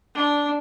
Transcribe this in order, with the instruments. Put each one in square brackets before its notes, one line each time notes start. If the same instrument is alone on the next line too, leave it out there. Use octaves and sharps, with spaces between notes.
[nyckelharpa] D4